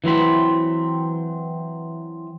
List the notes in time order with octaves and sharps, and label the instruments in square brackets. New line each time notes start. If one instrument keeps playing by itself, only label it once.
[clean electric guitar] E3 F#3 C4 B5